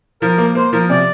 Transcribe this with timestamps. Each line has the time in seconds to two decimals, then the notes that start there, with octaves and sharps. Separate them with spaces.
0.22 F3 A#4
0.38 A#3
0.55 A#3 C5
0.73 F3 A#4
0.89 C3 D5